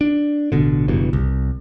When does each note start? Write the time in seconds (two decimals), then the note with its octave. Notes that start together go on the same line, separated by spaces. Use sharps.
0.01 D4
0.52 A1 B2 D3
0.88 F#1 E2 G2 B2
1.13 C2